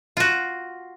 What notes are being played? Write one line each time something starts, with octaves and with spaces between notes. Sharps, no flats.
F4 F#4